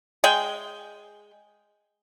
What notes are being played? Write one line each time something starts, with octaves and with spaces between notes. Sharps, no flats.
G#3 G#4 G5